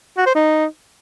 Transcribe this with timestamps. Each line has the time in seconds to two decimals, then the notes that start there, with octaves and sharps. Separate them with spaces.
0.18 F#4
0.26 C5
0.35 D#4